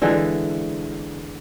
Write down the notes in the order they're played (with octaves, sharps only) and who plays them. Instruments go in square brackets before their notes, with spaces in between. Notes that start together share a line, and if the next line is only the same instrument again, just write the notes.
[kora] D3 E3 G#3